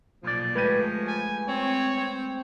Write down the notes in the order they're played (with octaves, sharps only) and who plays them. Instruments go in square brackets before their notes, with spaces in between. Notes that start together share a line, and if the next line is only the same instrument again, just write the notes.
[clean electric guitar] B1 A#2 D5 [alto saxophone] F3
[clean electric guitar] G#3 A3 G4 [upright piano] B4 D#7
[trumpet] G#5
[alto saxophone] C4 [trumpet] C#5
[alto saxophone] C4